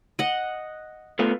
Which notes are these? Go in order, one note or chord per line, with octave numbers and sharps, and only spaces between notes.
D#5 F#5
A3 B3 F4